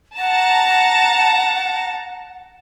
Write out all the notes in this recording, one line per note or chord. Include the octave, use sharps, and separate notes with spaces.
F#5 A5 A#5